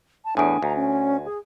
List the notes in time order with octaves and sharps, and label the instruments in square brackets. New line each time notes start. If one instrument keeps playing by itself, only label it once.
[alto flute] A5
[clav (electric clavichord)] E2 A2 [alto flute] D4 [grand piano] G#5 D#6 D7
[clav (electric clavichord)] D2 [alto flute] A#5
[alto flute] C#4
G#4